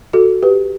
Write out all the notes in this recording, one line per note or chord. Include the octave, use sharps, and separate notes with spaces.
F#4 A4
G4 B4